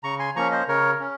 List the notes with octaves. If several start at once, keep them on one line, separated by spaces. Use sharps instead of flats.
C#3 A#5 C#6
G#5 C6
F3 A#3 C#4 A#5 C#6
C5 D#5
C#3 A#4 C#5
C#4